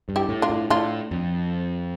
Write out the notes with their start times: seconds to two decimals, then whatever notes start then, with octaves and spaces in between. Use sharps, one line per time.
0.09 G2
0.16 E4 G4
0.29 A2
0.42 D4 F4
0.50 A2
0.70 A2 D4 F4
1.11 F2